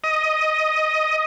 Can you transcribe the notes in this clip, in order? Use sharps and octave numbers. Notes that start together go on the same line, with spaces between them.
D#5